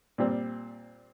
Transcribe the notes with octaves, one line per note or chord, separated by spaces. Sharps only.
A#2 G3 C4